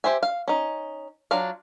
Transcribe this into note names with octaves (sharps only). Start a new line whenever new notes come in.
G4 C5 E5 G#5
F5
C#4 D#4
F#3 D4 F4 F5